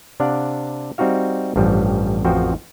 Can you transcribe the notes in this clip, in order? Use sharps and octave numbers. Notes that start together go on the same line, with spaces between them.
C3 D4 D5 F5 F#5
G3 C4 D#4 F#4 F5
A1 G2 F3 G3
A1 F2 F3 F#4 C5 G5